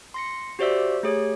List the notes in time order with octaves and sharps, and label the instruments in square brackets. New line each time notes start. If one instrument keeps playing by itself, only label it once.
[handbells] C6 A#6 C#7
F#4 G4 C5 D5 E5 E6
A3 G4 G#4 C#5